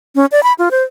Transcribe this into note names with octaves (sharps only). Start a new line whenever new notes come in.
C#4
D5
B5
F4
C5